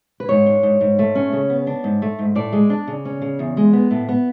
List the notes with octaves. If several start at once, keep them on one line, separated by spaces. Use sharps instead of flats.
B4
G#2 C#5
D4
G#2
G#2
A3
C#4
C#3
B3
D4
G#2
A3
G#2
A2 D5
G#3
D4
C#3
C#4
C#3
E2
G#3
B3
A2
B3